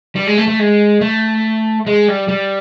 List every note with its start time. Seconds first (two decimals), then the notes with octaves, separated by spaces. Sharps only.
0.16 G3
0.27 G#3
0.37 A3
0.48 A3
0.59 G#3
1.01 A3
1.87 G#3
2.08 G3
2.28 G3